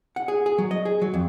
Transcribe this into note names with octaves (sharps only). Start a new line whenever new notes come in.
F#5
G#4
G#4
F#3
D#5
G#4
F#3
F2